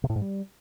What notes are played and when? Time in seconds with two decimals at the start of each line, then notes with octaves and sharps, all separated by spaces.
0.04 C3
0.10 A2
0.16 G#2
0.22 G3